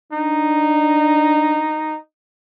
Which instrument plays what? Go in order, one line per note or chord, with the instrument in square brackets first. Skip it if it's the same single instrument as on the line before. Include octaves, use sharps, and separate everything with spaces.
[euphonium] D4 [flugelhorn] D#4